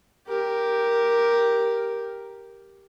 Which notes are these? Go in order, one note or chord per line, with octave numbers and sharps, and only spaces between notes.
G4 A#4